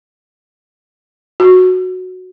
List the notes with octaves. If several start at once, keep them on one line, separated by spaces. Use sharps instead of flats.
F#4